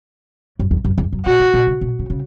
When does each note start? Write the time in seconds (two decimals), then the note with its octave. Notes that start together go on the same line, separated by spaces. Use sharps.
0.59 F#2
0.71 E2
0.85 F#2
0.98 E2
1.12 F#2
1.26 B2 F#4
1.40 E3
1.54 B2
1.67 C#3
1.81 B2
1.99 C#3
2.10 C#3